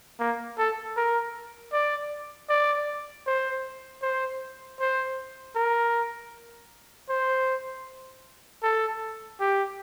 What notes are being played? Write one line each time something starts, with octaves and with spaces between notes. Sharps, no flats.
A#3
A4
A#4
D5
D5
C5
C5
C5
A#4
C5
A4
G4